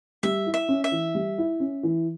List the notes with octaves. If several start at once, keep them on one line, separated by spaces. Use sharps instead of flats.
G3 E5
E4
E5
C#4
E5
E3
G3
E4
C#4
E3